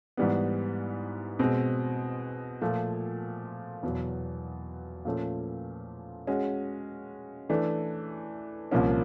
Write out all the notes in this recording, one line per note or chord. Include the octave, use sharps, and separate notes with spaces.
G#2 E3 G3 B3
B2 G#3 C4
A#2 F3 A3
E2 B2 F#3
A#2 F3 A3 C#4
G#3 C#4 F#4
E3 A3 D4
C2 A#2 F3 A#3 C#4